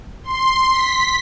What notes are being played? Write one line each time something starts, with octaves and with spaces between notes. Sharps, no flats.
C6
B6